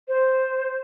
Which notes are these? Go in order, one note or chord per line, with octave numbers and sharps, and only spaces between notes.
C5